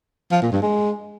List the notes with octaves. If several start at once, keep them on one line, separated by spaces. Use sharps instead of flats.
F3
A#2
G2
G#3